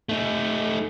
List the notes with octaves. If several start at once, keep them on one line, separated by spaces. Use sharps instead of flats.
A3 D#4